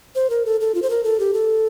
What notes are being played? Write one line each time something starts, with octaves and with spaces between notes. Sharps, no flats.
C5
A#4
A4
A4
F4
C5
A#4
A4
G4
A4